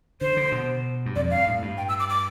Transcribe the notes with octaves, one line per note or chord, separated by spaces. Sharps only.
D3 C5
D3
B2
G2
F2 D5
G2 F5
A2
G2
G5
E6
D6
D6